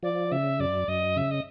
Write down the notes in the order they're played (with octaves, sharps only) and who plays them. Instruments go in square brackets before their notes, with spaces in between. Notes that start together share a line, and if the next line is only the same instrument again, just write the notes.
[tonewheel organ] F3 [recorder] D5
[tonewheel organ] C#3 [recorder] E5
[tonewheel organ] F#2 [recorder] D5
[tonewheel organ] F#2 [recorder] D#5
[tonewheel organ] C#3 [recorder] E5
[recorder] D#5